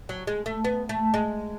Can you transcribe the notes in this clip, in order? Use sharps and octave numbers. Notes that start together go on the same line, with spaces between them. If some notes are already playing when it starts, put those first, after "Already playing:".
F#3
G#3
A3
B3
A3
G#3